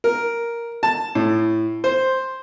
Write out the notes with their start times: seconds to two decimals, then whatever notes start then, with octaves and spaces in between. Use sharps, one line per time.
0.04 A#4
0.83 A5
1.15 A2
1.84 C5